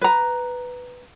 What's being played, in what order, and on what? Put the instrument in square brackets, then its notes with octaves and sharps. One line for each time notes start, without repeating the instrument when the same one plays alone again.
[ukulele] B4 A#5